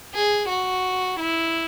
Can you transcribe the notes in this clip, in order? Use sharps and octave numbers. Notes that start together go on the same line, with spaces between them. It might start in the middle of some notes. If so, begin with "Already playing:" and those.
G#4
F#4
E4